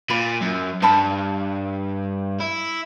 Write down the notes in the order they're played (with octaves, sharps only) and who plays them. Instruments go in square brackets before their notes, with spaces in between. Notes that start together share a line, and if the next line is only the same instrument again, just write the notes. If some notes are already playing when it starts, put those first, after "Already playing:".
[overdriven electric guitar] A#2 [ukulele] D5 B5
[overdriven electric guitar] F#2
[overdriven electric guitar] G2 [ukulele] F5 A5 B5
[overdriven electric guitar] E4